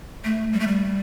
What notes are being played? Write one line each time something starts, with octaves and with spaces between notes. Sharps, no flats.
A3
G3
A3
G3